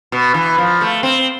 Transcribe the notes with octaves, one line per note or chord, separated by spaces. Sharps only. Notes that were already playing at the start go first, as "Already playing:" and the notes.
B2
E3
F3
A3
C4